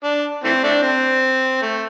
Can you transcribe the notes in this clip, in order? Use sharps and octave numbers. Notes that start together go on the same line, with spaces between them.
D4
E3 A3 C4
A3 D4
C4
A3